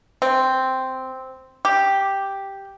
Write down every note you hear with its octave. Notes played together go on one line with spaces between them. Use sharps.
C4
G4